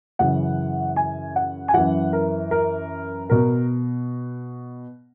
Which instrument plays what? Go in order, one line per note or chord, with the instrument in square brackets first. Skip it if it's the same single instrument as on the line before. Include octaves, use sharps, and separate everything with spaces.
[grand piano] F#2 C#3 E3 F#5
G#5
F#5
G#5
F#2 E3 F#5
A#4
A#4
B2 A#4